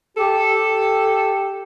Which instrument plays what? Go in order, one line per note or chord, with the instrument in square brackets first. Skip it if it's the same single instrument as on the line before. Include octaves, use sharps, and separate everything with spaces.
[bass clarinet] G4 [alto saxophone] A4
[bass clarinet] G4